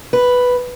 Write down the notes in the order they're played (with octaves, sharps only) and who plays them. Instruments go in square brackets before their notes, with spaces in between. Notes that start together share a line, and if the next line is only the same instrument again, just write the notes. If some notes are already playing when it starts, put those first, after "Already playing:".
[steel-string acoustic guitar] B4